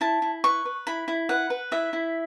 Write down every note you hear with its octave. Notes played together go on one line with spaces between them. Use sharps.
E4 A5
E4
B4 C#6
B4
E4 B5
E4
B4 F#5
B4
E4 E5
E4